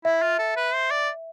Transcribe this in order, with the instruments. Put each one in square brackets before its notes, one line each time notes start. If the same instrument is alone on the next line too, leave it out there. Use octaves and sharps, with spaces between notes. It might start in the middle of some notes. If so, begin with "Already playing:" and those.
[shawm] E4 [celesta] E5
[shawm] F4
A4
B4
C5
D5